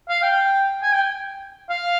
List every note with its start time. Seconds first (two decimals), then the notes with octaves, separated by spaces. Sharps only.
0.09 F5
0.23 G5
0.82 G#5
0.93 G5
1.70 F5